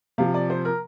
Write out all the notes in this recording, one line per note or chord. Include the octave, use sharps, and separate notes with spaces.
C3 F3 F5
D5
C5
A#4